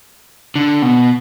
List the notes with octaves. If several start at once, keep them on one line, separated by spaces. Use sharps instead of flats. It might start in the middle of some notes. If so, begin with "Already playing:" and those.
D3
B2